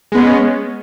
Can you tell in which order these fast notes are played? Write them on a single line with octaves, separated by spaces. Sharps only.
G#3 B3 C#4